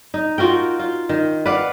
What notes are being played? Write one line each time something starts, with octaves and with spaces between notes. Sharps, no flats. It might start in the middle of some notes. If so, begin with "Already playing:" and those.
D#4
F4 F#4 A#4 G5
F4
D#3
B4 D5 F5 F#5